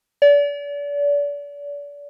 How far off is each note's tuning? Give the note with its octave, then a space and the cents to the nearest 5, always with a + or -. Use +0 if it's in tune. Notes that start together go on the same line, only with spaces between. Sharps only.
D5 -35